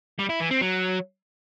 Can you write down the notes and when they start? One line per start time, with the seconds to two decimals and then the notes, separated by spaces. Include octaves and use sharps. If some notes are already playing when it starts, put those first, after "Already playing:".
0.19 G3
0.30 E4
0.40 E3
0.51 C4
0.61 F#3